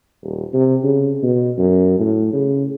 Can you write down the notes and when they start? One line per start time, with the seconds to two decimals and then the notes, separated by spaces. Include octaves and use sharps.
0.23 D#1
0.54 C3
0.84 C#3
1.23 B2
1.58 F#2
1.99 A2
2.34 C#3